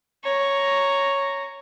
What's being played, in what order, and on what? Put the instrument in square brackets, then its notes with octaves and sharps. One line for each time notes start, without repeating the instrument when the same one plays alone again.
[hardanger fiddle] C#5 A#5